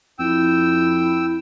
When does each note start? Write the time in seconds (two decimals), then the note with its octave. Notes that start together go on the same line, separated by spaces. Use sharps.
0.19 F2 E4 G5 E6